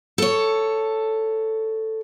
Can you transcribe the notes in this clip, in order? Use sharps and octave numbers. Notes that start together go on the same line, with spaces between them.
A4 C#5